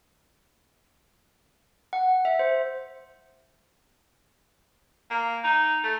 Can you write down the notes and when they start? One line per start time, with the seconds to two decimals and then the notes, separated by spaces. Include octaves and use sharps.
1.93 F#5
2.25 E5
2.39 C5
5.11 A#3
5.43 D#4
5.83 A3